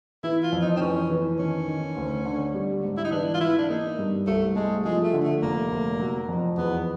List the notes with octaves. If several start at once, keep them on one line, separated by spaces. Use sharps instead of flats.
E3 E4
F4
F2
D#4
C4
E3 C#4
E3
D#3 C#4
D#3
D2
D3
G3
G#2
E4
D#4
E3 D4
F4
E3 E4
D4
A#3 D#4
G2
C2 A3
G#3 A3
F3 G#3
A3
D3
A3
F1 A#3
F1
F#3
F2
E2 B3